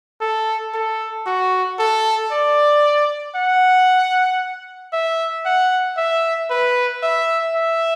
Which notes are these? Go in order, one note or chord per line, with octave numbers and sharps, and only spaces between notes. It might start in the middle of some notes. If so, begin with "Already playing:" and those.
A4
A4
F#4
A4
D5
F#5
E5
F#5
E5
B4
E5
E5